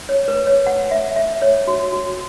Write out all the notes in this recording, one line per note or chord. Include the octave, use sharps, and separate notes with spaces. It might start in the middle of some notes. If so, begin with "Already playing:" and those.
C#5
B4
C#5
F#5
E5
E5
C#5
F#4
F#4